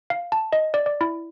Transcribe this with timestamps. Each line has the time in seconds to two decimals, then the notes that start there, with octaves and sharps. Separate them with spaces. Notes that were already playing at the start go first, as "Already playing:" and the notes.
0.10 F5
0.32 A5
0.53 D#5
0.74 D5
0.86 D5
1.01 E4